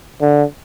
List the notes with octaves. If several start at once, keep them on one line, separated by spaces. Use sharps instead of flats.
D3